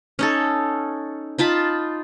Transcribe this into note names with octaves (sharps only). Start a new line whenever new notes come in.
C#4 D#4 A4
D#4 F4 A5 B5